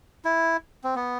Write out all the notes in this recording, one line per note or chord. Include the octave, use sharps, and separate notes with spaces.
E4
C4
B3